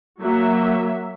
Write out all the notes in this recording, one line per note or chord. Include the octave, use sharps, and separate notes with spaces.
F#3 A#3 E5